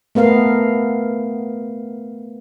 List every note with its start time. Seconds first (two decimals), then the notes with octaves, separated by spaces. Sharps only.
0.15 A3 B3 A#4 F5